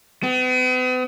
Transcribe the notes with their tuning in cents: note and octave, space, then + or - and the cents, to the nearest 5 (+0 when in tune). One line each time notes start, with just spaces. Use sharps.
B3 +45